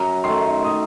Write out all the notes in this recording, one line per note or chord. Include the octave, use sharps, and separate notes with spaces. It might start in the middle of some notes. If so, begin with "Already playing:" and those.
Already playing: F#2 A#5
D#3 A3 C6
D#6